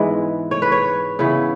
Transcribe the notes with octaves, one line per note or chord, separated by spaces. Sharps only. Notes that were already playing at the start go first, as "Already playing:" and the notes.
Already playing: G#2 E3 G#3 B3
C#5
B4
C#5
C#3 E3 B3